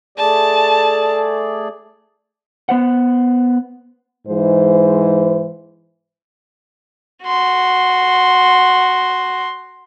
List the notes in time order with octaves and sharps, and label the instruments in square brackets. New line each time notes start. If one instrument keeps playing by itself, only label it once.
[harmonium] A3 G#4 D5 [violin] A5
[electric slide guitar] B3 C5 F#5
[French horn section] G#2 E3 G#3 C5
[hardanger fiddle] F#4 C6